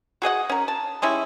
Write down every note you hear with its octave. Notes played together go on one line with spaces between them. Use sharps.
F#4 G#4 D#5 F#5
C#4 A#4
A5
G3 G#3 C#4 E4